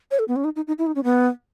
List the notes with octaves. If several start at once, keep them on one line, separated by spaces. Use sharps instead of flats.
C#5
A4
B3
C#4
D#4
D#4
D#4
E4
D#4
C#4
B3